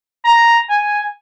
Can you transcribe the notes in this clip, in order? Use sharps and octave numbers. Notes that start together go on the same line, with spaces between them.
A#5
G#5